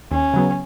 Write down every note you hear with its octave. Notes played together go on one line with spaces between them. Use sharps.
D#2 C#4
C#3 F#3 B3